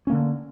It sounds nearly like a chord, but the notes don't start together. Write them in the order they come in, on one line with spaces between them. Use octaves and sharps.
C#4 A#3 D3